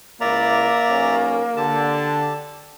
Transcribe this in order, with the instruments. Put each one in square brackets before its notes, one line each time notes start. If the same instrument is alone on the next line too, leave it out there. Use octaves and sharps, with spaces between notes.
[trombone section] C#2 E4 [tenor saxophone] A#3 [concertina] D5 E5 A#5
[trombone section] B1 C#4
[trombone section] D3 [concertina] G4 A5